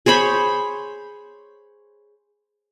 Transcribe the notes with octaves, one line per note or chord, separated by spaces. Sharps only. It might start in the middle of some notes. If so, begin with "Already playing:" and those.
G#4 C5 C#5 B5